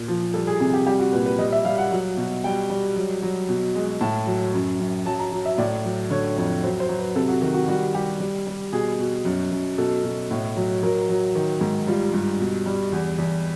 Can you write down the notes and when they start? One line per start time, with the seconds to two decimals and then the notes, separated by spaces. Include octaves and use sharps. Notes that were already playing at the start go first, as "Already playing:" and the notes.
Already playing: A#2
0.08 F3
0.34 G3 A4
0.47 G#4
0.60 C3 G#4
0.74 G4
0.87 G3 G4
0.99 F#4
1.13 A#2 B4
1.26 B4
1.39 G3 D#5
1.52 E5
1.65 G3 F5
1.78 F#5
1.92 F#3
2.17 B2
2.44 G3 G5
2.70 G3
2.96 F#3
3.22 F#3
3.49 B2
3.75 G#3
4.01 A2 A5
4.27 F#3
4.54 F#2
4.80 F#2
5.05 F#3 A5
5.19 A#5
5.32 F#3
5.46 E5
5.58 A2 D5
5.85 F#3
6.11 D3 C#5
6.37 F2 C#5
6.63 F#3 C5
6.80 C5
6.89 F#3
6.99 B4
7.16 C3 A4
7.29 F#4
7.42 D#3 F#4
7.54 F#4
7.68 G3 F#4
7.94 G3 G4
8.20 G3
8.47 G3
8.72 B2 G#4
8.99 B2
9.25 F#2
9.51 F#2
9.78 B2 A4
10.04 B2
10.31 A2
10.57 F#3
10.83 F#3 A#4
11.09 F#3
11.35 D#3
11.61 G#2
11.87 G3 F4
12.13 G2
12.40 B2
12.66 G3
12.92 E2
13.18 E2